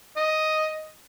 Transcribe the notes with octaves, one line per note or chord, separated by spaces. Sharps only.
D#5